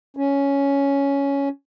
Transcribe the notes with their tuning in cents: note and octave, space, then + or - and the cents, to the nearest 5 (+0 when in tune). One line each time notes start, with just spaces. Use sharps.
C#4 +10